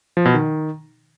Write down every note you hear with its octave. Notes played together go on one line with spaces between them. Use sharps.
F3
B2
D#3